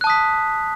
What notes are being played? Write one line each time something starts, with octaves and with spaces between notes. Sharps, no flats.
A5 D#6 F#6 B6